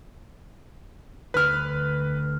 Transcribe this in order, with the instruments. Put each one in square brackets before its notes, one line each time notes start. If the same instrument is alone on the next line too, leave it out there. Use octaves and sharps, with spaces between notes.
[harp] D2 [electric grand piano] B4 F6